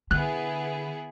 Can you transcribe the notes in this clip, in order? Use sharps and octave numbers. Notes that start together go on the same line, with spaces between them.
D3 B3 E4 G#4 F#6